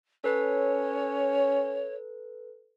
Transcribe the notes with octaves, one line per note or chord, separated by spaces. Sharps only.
C#4 A4 B4 C#5